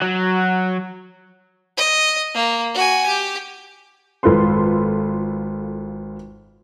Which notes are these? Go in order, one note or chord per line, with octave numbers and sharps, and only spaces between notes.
F#3 F#4
D#5
A#3
F#4 G#5
G4
G#1 F4 A4 B4 C6